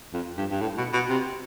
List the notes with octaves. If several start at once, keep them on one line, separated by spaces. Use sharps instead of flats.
F2
G2
G2
A2
B2
B2
C3